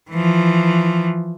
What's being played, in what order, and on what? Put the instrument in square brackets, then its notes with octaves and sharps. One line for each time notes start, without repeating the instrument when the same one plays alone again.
[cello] E3 F3